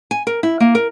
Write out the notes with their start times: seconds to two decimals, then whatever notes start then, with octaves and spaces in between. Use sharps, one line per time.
0.11 G#5
0.27 A#4
0.43 E4
0.60 A#3
0.75 A#4